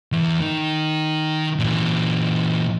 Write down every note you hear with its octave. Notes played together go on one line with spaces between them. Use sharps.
E2 E3
D#3
A#2 E3